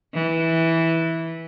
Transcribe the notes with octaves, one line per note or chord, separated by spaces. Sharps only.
E3